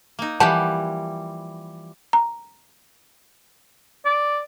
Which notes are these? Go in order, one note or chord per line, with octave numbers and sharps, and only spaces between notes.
A#3 D#4
E3 F3 G3 G4 F#5 A5
A#5
D5